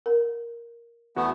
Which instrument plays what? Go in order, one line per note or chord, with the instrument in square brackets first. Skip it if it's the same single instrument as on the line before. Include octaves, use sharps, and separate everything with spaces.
[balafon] A#4
[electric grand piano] E2 F#4 [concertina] A3 B3